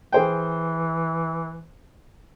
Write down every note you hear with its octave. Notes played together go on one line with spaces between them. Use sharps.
E3 G#4 C5 G5